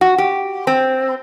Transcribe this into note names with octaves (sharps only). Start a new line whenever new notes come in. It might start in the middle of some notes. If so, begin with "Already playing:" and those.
F#4
G4
C4